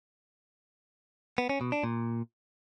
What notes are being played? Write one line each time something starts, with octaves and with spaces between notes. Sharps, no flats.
B3
C#4
B2
D4
A#2